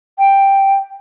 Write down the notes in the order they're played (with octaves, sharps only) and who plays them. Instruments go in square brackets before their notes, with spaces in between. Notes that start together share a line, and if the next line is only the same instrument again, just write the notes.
[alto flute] G5